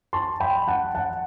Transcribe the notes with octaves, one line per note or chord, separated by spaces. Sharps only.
A5 C6
G5 B5
F#5 A5
F#5 A5